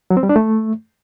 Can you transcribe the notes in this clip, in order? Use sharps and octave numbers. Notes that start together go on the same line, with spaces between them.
F#3
C4
G3
D4
A3